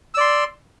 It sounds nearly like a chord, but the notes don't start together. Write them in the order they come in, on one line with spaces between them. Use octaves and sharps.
E6 D5 C6